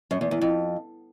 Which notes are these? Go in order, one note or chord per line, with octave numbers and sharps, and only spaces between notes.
F#2
E2
E2
F2